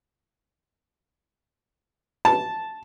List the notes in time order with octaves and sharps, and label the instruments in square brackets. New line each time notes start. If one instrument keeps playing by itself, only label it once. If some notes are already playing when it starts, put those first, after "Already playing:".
[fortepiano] A5